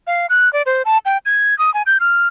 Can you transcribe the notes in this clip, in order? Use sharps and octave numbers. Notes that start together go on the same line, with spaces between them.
F5
F#6
D5
C5
A5
G5
G#6
D#6
G#5
G6
F6